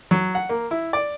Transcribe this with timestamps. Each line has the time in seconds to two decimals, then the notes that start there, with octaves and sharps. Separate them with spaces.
0.11 F#3
0.35 F#5
0.49 A#3
0.71 E4
0.93 D5